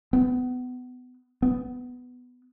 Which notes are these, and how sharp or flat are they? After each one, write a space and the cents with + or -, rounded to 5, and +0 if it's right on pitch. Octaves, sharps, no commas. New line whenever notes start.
B3 +25
B3 +10